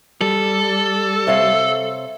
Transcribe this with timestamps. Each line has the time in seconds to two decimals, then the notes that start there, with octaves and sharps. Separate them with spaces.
0.21 G3 A4
1.27 C3 C#5 F5